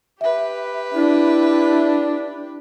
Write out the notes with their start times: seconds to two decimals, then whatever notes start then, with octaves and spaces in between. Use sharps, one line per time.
0.21 G4 B4 E5
0.94 D4 E4